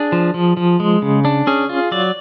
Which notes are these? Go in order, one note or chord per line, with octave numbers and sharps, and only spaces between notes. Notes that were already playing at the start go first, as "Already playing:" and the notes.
Already playing: D4 G#4
F3
F3
F3
G#3
C#3
D4
C#4 G#4
F4
F#3 D5